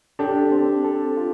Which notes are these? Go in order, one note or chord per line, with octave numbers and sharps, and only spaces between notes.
D4 G4 A4
C4
A4
F4